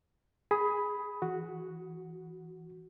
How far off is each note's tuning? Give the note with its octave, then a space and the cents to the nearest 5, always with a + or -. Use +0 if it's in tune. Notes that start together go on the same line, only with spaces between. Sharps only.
G#4 +0 B5 +0 D#6 +20
E3 +0 F#4 +0